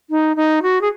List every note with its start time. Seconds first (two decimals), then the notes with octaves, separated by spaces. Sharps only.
0.10 D#4
0.36 D#4
0.62 F#4
0.81 G#4